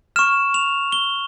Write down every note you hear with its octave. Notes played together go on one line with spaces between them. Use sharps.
C#6 F6 E7
F7
G7